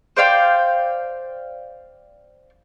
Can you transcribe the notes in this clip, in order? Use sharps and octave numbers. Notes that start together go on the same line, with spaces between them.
C5 D5 F5 G5